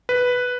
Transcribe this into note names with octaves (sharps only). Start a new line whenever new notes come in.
B4